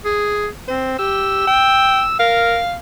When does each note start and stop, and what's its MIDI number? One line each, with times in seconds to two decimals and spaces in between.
0.05 0.47 68
0.68 0.98 60
0.68 0.99 72
0.99 1.44 67
0.99 2.15 88
1.47 2.03 79
2.19 2.59 70
2.19 2.77 77